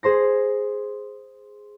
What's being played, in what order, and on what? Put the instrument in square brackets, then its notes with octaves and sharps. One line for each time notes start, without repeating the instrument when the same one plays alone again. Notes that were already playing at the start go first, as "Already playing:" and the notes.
[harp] G#4 C5 C6 A#6